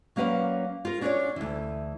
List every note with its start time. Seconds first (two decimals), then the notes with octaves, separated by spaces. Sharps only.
0.16 F#3 A#3 C#4 B4 D5 F5
0.85 F4 A#4
1.01 C#4 D4 F#4 A#4 C#5 D5
1.36 D2 E3